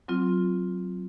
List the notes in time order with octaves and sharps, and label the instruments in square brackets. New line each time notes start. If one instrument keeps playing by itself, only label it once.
[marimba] F#3 C4 F4